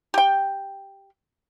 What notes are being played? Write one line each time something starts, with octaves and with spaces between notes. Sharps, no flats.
G4 G5